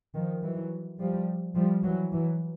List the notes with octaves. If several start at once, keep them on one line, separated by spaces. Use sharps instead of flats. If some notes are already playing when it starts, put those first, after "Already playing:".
D#3 F3
E3 F#3
F3 G3
F3 G3
E3 F#3
E3 F#3